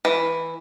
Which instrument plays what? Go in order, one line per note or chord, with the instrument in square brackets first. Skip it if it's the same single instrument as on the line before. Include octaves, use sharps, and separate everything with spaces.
[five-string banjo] E3